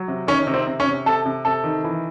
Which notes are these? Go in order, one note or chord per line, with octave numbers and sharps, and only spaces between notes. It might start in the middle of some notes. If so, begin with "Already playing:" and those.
Already playing: F#3
C3
D#3 C#4
C3
C4
C3
C#4
C3
C3 A4
C3
C3 A4
D#3
E3